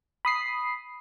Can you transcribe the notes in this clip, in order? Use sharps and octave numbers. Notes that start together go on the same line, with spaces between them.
B5 D#6 C7